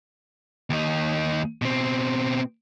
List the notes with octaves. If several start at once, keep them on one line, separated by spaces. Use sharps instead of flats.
D#2 D#4
B2 C4